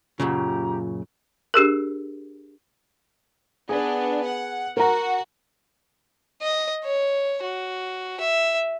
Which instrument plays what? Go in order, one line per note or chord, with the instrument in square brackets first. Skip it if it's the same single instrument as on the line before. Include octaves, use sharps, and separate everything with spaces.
[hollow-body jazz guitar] F#2 A#2 C#3 [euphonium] F4 [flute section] G4 A#5
[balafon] D4 G4 G#4 A#4
[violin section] B3 D4 [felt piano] G#4
[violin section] F#5
[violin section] F#4 [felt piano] A#4 A#5
[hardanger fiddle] D#5
C#5
F#4
E5